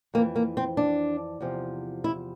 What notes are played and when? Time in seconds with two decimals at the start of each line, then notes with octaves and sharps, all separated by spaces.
0.14 F2 A#3
0.18 E3
0.36 A#3
0.57 C4
0.77 D4
1.41 E2 C3 F3
2.04 E4